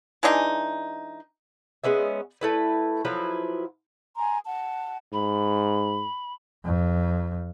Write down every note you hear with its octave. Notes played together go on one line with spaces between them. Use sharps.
E3 G#3 D4 D#4
G#3 B3 C#4 E5
A3 E4 B4
F3 F#3 E4 B4
G#5 A#5 C6
F#5 A5
G#2 B5
F2